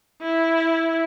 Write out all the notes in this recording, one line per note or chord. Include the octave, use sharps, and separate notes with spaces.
E4